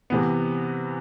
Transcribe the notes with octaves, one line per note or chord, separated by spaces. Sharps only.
C3 E3 B3